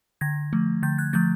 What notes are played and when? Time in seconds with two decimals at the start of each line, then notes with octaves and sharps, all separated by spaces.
0.21 D3 G#6 A#6
0.53 F3 A3
0.83 D3 G6 A6
0.98 F#6 G#6
1.13 F3 A3 G6 A6